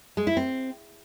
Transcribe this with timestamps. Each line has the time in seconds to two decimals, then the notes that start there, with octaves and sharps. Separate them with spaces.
0.17 G#3
0.27 E4
0.37 C4